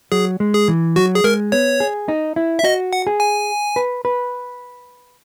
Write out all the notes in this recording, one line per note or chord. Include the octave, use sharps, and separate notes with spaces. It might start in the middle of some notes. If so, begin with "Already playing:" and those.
F#3 G#4
G#3
G#4
E3
F#3 F#4
G#4
G#3 A#4
B3 C#5
G#4
D#4
E4
E5
F#4 D#5
F#5
G#4
G#5
B4
B4